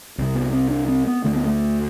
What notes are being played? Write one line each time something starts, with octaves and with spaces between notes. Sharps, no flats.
C2 C3
B3
C4
D4
C4
B3
D2 D3 A3
B3
A3